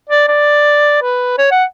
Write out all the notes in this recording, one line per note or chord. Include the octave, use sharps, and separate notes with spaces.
D5
D5
B4
C#5
F#5